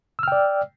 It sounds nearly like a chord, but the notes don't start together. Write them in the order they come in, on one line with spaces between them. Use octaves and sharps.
E6 F6 G5 D5